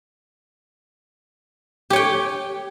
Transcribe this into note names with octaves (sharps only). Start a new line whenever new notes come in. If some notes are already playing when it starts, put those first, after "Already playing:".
G4 C#5 G5